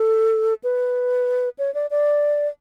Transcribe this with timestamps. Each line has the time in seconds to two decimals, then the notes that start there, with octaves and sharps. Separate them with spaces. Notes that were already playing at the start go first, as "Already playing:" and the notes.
Already playing: A4
0.64 B4
1.59 C#5
1.74 D5
1.91 D5